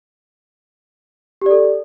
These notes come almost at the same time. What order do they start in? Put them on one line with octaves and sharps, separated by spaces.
G4 D5 A4